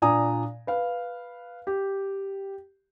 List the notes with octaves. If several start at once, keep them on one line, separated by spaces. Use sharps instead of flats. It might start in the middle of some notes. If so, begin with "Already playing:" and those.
A#2 D4 D5 G#5 A#5 D#6
B4 F5
G4